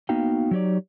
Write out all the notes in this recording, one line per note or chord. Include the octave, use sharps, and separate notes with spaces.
A#3 B3 D#4 F#4 F5 G5
F#3 D#4 G4 C#5 D5